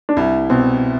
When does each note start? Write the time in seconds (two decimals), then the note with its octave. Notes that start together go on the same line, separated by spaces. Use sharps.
0.09 D4
0.17 C2 E4
0.50 B2 C4